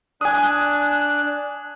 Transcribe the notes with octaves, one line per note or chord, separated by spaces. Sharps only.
D4 G#5 D#6 F#6